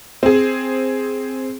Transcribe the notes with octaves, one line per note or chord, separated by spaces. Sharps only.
C4 G#4